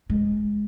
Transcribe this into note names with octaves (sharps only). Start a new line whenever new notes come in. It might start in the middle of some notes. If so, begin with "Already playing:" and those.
G#3